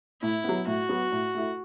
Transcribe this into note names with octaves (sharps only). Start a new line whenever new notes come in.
A2 E4
F#3 B3
A2 F#4
F#3 B3
A2
A3 E4